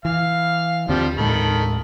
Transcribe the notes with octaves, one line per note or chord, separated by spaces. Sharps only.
E3 F5
D#2 D3 F3 G3 C4
D#2 A2 D#3 G#3 A4 B5